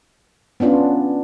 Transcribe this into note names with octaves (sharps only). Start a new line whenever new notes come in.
B3 C#4 D4 F4